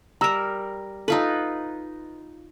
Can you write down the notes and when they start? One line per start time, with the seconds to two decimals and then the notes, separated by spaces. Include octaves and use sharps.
0.21 G3 A#4 A#5 E6
1.08 D#4 F4 A4 B4